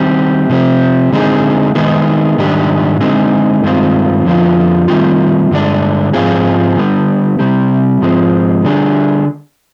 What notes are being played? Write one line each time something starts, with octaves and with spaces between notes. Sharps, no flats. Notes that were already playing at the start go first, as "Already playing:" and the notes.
Already playing: D#3 G3 C4 G4
C3 F3 C4 G4
D3 G#3 C4 D#4 G#4
D#3 G#3 B3 D#4 G#4
G#2 D#3 G3 D4 G4
D3 G#3 C4 D#4 G#4
G2 D#3 G#3 C4 F4
F2 D3 F3 B3 F4
D#3 G3 C4 F4
G2 D3 G#3 D4
G#2 F3 C4 F4 G#4
D3 G3 B3
C3 G3 C4 G4
G#2 F3 G#3 C4
D3 G3 D4 G#4